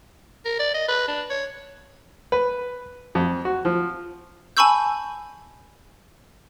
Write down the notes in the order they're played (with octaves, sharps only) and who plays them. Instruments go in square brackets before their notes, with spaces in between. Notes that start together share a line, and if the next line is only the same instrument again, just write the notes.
[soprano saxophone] A#4
D5
D#5
B4
D4
C#5
[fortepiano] B4
F2
F#4
F3
[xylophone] G#5 A5 B5 C#6 E6 G6